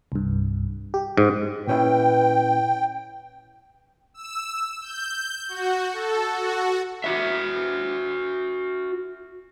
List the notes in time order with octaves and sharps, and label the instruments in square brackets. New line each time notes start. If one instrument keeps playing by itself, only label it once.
[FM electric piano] C2 G2
G4
[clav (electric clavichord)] G#2
[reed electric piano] A#2 C#4 E4 [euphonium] B4 [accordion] G5
[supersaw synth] E6
G6
F#4
A4
F#4
[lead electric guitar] F#4 E5